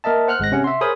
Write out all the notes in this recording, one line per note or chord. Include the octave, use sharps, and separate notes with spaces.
A#3 A#4 D#5 E5 A5
C5 F#5 F6 F#6
G#1 G#3 F#6 A#6
C3 C#4 F#5
E5 C6
G#4 A#4 C5 C#5 B5 D#6